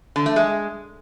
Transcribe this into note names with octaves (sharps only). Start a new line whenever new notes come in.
D3
A3
G#3